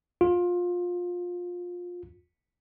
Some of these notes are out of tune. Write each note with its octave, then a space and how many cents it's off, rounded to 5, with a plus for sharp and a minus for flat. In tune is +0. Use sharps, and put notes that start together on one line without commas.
F4 +20